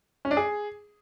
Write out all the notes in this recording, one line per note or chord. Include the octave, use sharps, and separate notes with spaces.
C#4
D4
G#4